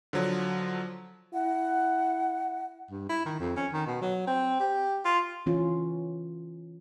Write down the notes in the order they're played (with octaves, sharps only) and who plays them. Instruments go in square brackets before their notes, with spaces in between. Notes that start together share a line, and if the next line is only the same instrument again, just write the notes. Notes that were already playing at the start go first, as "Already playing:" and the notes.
[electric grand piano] D3 F3 F#3
[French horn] E4 [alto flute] F#5
[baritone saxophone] G2
E4
D#3
F2
C#4
D#3
B2
F#3
C4
G4
F4
[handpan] E3 C#4 F4